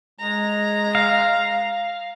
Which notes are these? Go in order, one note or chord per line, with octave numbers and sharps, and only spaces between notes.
G#3 A#5
F5